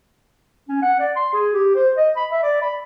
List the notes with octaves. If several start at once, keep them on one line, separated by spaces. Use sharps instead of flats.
C#4
F#5
D5
C6
G#4
G4
C5
D#5
B5
E5
D5
B5